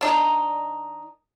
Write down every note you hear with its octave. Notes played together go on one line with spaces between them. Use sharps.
D#3 D4 D#4